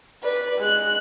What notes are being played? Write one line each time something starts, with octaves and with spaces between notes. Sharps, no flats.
B4 D5
G#3 F#6